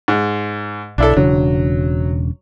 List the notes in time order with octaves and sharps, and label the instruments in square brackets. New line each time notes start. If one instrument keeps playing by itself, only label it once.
[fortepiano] G#2
[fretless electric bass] B1 [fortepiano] D4 E4 A4
[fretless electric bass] E1 C#3 D4 [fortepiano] F#3